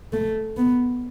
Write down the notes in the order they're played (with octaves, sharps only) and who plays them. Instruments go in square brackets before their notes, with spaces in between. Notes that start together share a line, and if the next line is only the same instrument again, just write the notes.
[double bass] A3
B3